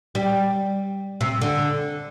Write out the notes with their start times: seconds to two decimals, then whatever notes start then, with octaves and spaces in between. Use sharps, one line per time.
0.15 G3
1.21 C3
1.41 D3